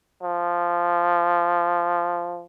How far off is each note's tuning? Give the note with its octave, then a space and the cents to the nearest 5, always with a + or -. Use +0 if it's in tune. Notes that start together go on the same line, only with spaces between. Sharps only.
F3 -10